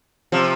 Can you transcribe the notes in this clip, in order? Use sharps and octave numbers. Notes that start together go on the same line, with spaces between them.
C3 F3